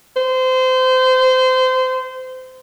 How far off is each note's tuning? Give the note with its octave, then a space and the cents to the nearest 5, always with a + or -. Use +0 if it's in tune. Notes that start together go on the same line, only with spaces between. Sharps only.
C5 -25